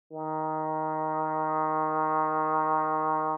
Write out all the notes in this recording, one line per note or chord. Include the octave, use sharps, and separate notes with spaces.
D#3